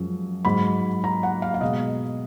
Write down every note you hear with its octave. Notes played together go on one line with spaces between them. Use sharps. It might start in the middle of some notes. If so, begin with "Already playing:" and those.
Already playing: F#2 F3 G#3
G#2 F#3 B5
A#5
F#5
F5
F5
B2 G#3 D#5